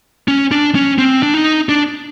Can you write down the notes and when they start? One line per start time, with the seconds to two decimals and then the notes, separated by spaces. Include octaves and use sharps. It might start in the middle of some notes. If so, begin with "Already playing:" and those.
0.28 C#4
0.51 D4
0.75 C#4
0.98 C4
1.23 D4
1.34 D#4
1.69 D4